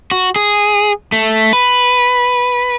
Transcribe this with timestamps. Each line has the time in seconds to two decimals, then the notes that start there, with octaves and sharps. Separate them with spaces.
0.11 F#4
0.36 G#4
1.12 A3
1.53 B4